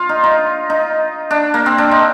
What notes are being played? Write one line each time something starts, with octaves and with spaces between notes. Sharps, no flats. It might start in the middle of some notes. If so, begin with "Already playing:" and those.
Already playing: F4
D#4
D#4
D#4
D4
A#3
C4
D4
D#4